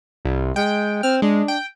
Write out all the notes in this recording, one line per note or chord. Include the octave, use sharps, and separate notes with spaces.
C2
G#3 G5
C4 F6
G#3 D4
G5